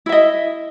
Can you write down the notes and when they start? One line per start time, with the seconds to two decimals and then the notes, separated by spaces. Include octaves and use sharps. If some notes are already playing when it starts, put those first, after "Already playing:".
0.06 E4
0.09 E5
0.12 D#5